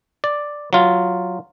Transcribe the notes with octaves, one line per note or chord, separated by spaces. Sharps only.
D5
F#3 F4